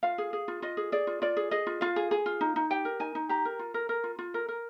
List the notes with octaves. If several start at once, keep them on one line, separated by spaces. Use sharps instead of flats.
F4 F5
G#4
G#4
F4
F4 D#5
G#4
G#4 D5
F4
F4 D5
G#4
G#4 D#5
F4
F4 F5
G#4
G#4
F4
D#4
D#4
G4 G5
A#4
D#4 G#5
D#4
G4 A#5
A#4
F4
A#4
A#4
F4
F4
A#4
A#4